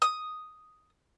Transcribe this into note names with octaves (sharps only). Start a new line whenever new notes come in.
D#6